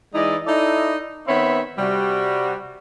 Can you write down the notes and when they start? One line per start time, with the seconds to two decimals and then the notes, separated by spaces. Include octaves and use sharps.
0.14 E3 G#3 D#4 E4 D5 D#5
0.46 D#4 E4 A4 D5 D#5
1.27 D#3 B3 C4 C#5 E5 B5
1.78 C3 G3 F#4